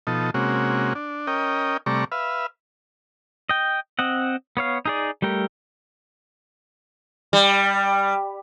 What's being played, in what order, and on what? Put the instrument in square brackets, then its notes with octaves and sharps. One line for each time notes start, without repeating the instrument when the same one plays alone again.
[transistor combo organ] B2 F3 D#4 A4
C3 G#3 A#3 C#4 F#4
D4
C#4 A#4 D#5 G5
C3 G3 A3 D5 A#5 C#6
B4 E5 F5
[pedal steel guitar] D#5 G5
C4 D#5 F#5
B3 C#5 F5
D#4 G#4 D5
G3 A3 G4 A#4
[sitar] G3